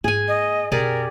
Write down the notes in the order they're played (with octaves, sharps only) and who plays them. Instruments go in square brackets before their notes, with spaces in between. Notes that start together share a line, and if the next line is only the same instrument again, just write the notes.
[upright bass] G#2 A#3 [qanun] G#4 G#5
[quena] D#5
[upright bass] F#2 B2 [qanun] G4 G#4 D5 [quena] A#4